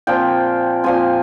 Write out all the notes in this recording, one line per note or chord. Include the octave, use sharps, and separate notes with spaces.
A#2 F3 C4 G5
A#2 F3 C4 G#5